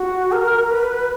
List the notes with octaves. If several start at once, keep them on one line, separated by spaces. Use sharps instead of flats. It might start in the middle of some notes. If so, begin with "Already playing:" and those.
Already playing: F#4
A#4
B4